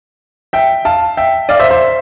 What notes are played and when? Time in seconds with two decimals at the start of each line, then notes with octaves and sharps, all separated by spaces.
0.53 E5 G5
0.85 F5 A5
1.17 E5 G5
1.49 D5 F5
1.59 C5 E5
1.70 C5 E5